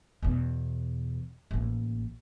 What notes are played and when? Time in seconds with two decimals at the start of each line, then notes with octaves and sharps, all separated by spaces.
0.23 E2 B2
1.51 A1 A#3